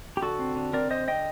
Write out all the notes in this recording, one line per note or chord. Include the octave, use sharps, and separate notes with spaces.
G4
D3 F#4 A4
C4
D3
C4 A#4 D5
D3 C5 D#5
D3 D#5 G5